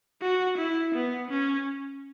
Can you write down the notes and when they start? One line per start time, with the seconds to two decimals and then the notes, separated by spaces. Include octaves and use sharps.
0.22 F#4
0.58 E4
0.94 B3
1.30 C#4